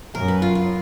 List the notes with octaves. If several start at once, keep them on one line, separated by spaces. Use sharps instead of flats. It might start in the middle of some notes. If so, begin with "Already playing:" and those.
F#2 A#4
B4
F4
F4